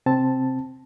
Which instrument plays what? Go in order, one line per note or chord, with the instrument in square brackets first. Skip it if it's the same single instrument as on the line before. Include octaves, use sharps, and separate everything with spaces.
[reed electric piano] C3 C4 A5